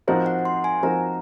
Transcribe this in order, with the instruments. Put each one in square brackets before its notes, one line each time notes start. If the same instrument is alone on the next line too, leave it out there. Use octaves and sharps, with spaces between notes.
[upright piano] F3 C4 D#4 F#4 A#4 [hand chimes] C5
[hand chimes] F#5
C6
G#5
[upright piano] F3 C4 D#4 F#4 A#4 [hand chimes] A#5